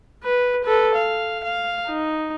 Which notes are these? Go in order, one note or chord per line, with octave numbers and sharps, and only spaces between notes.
B4
A4 B4
F5
F5
D#4